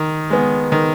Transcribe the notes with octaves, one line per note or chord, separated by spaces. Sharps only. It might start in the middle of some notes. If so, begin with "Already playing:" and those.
Already playing: D#3
G#3 B3
D#3